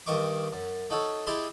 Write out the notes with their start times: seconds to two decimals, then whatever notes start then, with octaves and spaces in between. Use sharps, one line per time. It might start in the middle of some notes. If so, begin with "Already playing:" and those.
0.06 G2 D#3 A#4 D#5 C#6 D6
0.52 F#2
0.90 A3 D#4 F#4 A4 C#5
1.27 E4 G4 G#4 D#5 A5 C6